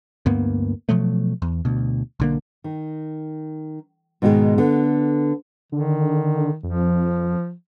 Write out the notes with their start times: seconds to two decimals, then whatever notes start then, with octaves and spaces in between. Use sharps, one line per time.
0.26 D2 G2 A#3 B3
0.89 B2 F3 F#3 A3
1.42 E2
1.65 D2 B2
2.20 B1 D3 A#3
2.64 D#3
4.22 G#2 B2 D#3 G3 G#3
4.58 D3 B3
5.72 D3 D#3
6.63 F2 F3